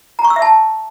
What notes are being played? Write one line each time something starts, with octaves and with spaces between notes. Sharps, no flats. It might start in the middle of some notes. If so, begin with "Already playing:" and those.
A#5
C#6
E6
E5
A5